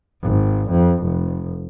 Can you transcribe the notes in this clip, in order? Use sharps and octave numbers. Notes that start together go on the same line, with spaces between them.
G#1
F2
F1